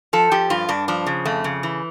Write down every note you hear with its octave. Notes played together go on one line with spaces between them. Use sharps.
F3 A4
F3 G4
G2 F4
G2 D4
F3 D4
C#3
F2 A3
C#3
E3